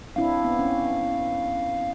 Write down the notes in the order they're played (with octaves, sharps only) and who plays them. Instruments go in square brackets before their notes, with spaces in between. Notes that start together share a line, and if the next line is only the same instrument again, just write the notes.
[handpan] C4 D4 E4 [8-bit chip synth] F5
[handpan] B3
C#4